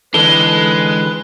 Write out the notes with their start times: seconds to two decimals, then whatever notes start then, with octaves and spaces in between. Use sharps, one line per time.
0.14 D3 E3 G#3 A4 B4 G7